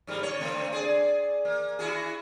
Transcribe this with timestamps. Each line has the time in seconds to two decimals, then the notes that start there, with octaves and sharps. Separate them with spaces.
0.07 G#2 G3 A#3
0.19 D3 C#5
0.40 D3 A3 C4
0.72 G#4 D5
1.45 A#3
1.79 E4 F#4 G#4